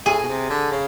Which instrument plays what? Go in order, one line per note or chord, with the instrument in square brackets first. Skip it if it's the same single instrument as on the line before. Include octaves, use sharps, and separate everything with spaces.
[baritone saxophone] A2 [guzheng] G#4
[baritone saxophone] B2
C3
D3
C#3